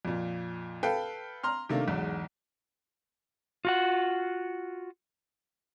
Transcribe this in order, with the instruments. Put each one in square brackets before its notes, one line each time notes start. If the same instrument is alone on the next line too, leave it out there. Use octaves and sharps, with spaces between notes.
[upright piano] F2 A#2
A4 B4 F5 G5
A#5 C6 F6
C3 D#3 A3 A#3 D4
B1 E2 G#2
[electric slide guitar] F4 F#4 F#5